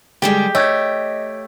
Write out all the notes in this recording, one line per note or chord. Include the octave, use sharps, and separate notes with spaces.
D3 G3 G#3 G4
A3 C#5 D#5 G5 G#6